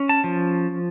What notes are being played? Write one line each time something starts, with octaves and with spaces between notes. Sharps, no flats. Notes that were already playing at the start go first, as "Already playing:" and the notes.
Already playing: C#4
A5
F3